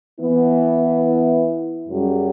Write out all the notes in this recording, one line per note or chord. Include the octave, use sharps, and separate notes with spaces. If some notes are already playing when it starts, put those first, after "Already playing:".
E3 B3 E4
F#2 C#3 G3 C#4 F#4